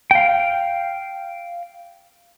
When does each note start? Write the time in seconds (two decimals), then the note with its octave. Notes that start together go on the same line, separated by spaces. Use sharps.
0.11 F5 G5